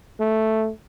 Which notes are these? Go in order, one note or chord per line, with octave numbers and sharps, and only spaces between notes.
A3